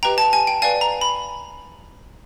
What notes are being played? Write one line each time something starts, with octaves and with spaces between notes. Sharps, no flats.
G4 B4 D#5 G5 A#5
A5
G#5
G5
B4 D5 F5 G#5
A#5
B5